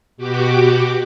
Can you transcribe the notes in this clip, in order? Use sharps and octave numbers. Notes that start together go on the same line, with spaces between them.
B2 F#4 G4 D6